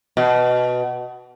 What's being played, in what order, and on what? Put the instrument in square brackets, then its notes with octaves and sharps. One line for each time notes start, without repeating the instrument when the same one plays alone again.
[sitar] B2